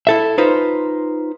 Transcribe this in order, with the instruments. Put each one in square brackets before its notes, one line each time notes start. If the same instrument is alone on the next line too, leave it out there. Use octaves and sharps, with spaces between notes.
[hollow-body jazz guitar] E4 A4 E5
D#4 F4 B4 C5